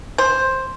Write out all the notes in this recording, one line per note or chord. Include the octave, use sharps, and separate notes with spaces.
C5